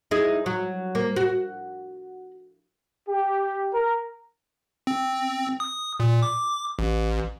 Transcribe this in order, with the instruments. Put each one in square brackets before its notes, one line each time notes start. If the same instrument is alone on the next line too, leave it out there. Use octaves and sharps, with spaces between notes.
[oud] D#4 E4 G#4
F#3
A#3
F#4
[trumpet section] G4
A#4
[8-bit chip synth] C4
D#6
A#2
D6
A1